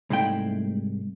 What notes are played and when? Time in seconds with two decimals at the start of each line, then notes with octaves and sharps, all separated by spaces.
0.10 C2 G#2 G#3 A3 D#4 G5